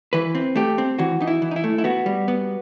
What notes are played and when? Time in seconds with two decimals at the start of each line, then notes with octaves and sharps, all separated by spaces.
0.13 E3 B4
0.35 C4
0.56 A3 G4
0.78 C4
0.99 E3 F#4
1.21 E3 D#4
1.27 E4
1.42 E3
1.51 D#4
1.56 E4
1.64 A3
1.78 E4
1.84 B3 F#4
2.06 G3
2.28 B3